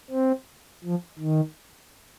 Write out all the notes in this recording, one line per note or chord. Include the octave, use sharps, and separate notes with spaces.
C4
F3
D#3